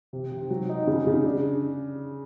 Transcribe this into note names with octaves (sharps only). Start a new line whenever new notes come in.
C3
C3
F#3
D#4
C#3
C#3
D4